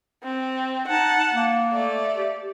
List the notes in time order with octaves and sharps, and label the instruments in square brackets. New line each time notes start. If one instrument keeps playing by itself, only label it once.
[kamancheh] C4
[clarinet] D#4 [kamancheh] F#5 A5
[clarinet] A#3
[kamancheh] A3 D5
[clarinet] G4